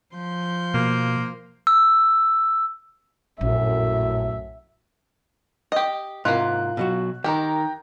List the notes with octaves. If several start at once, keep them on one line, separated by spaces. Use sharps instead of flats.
F3 C6 G6
B2 A#3
E6
A#1 F#2 A2 E5
G4 D#5
G#2 C3 A#3 E4 F4 F#6
B2 F#3 F#4
D#3 G4 A#4 G5 A#5